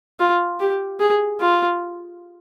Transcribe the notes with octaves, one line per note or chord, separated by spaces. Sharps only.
F4
G4
G#4
F4